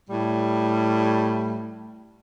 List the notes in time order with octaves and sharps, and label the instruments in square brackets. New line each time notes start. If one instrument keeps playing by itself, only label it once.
[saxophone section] A2 G3